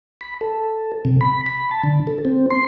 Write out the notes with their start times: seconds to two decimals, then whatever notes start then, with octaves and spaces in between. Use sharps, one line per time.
0.21 B5
0.41 A4
1.05 C3
1.21 B5
1.46 B5
1.71 A5
1.83 D3
2.07 A4
2.25 C4
2.50 C6